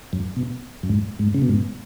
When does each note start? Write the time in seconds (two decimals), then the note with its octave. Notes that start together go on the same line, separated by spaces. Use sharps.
0.13 F#2
0.36 B2
0.83 F#2
0.89 G#2
1.19 G#2
1.34 C#3
1.42 B2
1.49 G#2